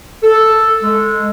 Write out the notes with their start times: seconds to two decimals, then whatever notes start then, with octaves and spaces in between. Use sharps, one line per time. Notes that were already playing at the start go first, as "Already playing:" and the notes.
0.24 A4
0.83 G#3